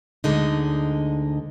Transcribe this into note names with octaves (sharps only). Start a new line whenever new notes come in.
D2 D3 G#3 D#4